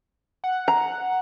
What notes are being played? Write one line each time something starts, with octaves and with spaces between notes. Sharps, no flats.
F#5
A#5